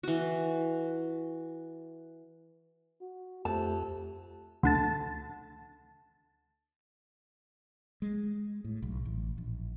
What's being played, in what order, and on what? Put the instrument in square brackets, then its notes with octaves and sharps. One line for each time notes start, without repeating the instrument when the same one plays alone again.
[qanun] E3 F#4
[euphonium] F#4
[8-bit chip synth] F2 [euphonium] A3 [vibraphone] F4 G4 C5 [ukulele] A5
[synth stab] D2 D3 A5
[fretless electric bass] G#3
A2
B1
A1
A#1